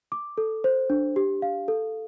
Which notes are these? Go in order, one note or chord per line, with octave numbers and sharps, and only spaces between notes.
D6
A4
C5
D4
G4
F5
A4